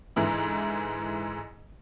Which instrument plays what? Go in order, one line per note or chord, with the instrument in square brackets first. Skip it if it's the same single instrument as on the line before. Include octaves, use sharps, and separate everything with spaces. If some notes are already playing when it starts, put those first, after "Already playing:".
[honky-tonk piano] G#2 D3 E3 E4